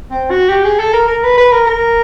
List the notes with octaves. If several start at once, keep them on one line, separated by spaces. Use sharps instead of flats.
C4
F#4
G4
G#4
A4
A#4
A#4
B4
B4
A#4
A#4